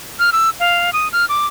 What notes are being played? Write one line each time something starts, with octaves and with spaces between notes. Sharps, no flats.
F6
E6
F5
D#6
F6
D6